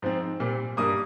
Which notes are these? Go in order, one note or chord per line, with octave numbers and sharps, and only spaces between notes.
G#2 F3 C4
A#2 G3 C4
G2 G3 A#3 D#6